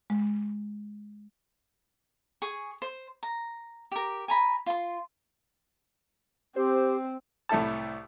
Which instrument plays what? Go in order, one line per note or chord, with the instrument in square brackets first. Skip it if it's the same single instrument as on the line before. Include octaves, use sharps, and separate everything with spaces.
[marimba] G#3
[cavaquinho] G#4 C#6
C5
A#5
G4 A#4
G#5 A#5 B5
F4 C6
[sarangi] C4 [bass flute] G4 [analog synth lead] C5
[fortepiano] C2 A2 E4 A4 A5